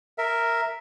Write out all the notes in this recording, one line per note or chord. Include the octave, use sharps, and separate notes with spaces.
A#4 E5